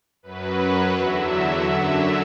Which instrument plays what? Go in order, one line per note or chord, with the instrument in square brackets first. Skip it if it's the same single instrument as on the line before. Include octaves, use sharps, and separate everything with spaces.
[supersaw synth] F#2 F#3 B4
E2 D3 F#3 E5
F#2 D3 F#3 E5